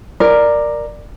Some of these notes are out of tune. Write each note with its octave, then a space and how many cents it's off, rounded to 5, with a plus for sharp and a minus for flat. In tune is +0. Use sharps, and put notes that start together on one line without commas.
A#4 +0 D5 +10